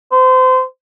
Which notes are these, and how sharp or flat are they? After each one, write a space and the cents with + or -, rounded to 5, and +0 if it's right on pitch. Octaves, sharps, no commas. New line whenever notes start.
C5 -30